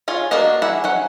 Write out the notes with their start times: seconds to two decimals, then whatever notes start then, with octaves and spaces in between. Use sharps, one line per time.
0.08 F4 G#4 C#5
0.31 A#3 D4 F#4 A#4 D#5
0.62 E4 G#4 E5 F#5
0.84 F#3 C#4 F#5